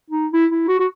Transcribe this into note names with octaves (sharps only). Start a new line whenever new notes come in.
D#4
E4
E4
F#4
F#4